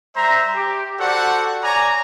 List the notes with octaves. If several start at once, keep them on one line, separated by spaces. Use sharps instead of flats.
G3 C5 E5 A#5
G4
F#4 G4 A4 C5 D5 F#5
C#5 D5 G#5 A#5